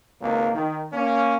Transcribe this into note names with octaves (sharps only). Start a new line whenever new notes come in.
G#1 C#2 A#3
D#3
A#3 C#4